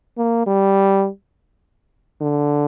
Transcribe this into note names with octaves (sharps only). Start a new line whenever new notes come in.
A#3
G3
D3